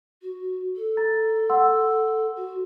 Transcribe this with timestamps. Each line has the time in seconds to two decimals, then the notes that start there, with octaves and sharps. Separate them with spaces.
0.22 F#4
0.76 A4
0.97 A#5 A6
1.50 F#5 C6 E6
2.36 F#4